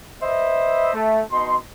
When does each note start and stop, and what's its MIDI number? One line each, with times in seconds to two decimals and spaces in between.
0.22 0.91 71
0.22 0.91 72
0.22 0.91 75
0.22 0.91 76
0.94 1.24 57
1.32 1.57 47
1.32 1.57 63
1.32 1.57 84